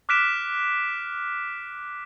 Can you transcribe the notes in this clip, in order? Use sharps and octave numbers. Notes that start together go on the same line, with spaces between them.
D6 F6 F#6 B6 D7 E7